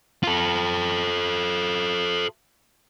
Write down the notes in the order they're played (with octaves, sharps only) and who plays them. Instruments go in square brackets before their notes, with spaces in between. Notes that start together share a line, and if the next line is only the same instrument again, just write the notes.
[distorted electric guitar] F4 A4